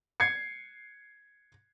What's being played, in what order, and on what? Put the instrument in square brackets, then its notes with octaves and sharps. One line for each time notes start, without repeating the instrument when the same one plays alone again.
[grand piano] G#6 C7 C#7